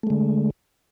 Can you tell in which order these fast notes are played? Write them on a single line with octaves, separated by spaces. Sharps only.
A3 G#3 D3